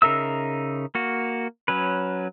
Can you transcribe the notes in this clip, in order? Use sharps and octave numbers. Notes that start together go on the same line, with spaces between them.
C#3 D#4 A#4 E5 E6
A#3 F#4
F#3 C#4 B4